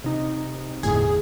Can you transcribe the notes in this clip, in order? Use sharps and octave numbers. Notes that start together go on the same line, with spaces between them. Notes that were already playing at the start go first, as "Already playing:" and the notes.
C3 D#4
G1 E2 A2 G#4